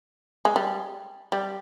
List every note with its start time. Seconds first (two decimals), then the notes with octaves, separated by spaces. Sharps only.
0.45 G#3
0.56 G3
1.32 G3